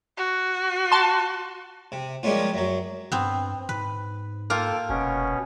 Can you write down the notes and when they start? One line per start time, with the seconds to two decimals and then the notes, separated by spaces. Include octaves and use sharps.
0.17 F#4
0.92 A5 C6
1.92 C3
2.23 F3 G3 G#3 A#3 C#4 F4
2.54 F#2 F#3
3.12 G2 B3 C4
3.69 G#2 B4
4.50 A#3 F4 A4 G5
4.89 F1 B2 C#4